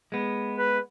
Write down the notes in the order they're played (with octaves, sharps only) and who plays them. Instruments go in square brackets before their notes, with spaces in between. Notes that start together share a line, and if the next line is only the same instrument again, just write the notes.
[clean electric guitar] G#3 B3
[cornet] B4